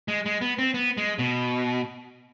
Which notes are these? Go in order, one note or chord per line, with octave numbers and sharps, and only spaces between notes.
G#3
G#3
B3
C4
B3
G#3
B2